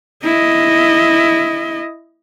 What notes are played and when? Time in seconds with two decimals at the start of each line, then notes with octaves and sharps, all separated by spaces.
0.24 E4 D#5